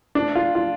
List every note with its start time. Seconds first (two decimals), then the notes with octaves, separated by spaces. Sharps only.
0.15 D4
0.35 F4
0.55 F4